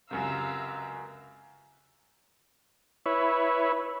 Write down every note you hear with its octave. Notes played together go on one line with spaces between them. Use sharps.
C#2 F#2 C3 F5 A#5 E6
E4 B4 C#5